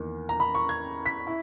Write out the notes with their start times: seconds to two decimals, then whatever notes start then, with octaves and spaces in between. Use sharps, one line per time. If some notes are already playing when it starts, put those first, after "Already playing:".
Already playing: E2 D#3 A#3
0.29 A#5
0.40 B5
0.55 C#6
0.69 G#6
1.06 B6
1.27 E4